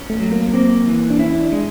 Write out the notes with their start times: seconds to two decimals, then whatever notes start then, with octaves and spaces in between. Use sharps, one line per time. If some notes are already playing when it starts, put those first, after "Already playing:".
Already playing: C#4
0.10 A3
0.20 F#3
0.32 A#3
0.53 A#3 C4
0.87 E3
1.10 D4
1.19 C#4 E4
1.40 D4
1.52 G#3 D4